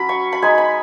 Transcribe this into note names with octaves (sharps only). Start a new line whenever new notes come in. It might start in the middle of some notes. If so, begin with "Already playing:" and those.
Already playing: F#3 C#4 B5
C#6
B5
G#3 D#4 G#5
B5